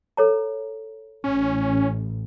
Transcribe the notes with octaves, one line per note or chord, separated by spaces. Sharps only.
A4 C#5 A#5
A1 C#4